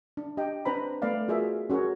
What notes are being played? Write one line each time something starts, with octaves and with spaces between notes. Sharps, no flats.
D4
D4 G4 D#5 G5
C4 D4 B4 C5 A#5 B5
A3 B3 B4 D5 F5
F4 F#4 G#4 A#4 E5
C#4 F#4 G#4 A#4 C#5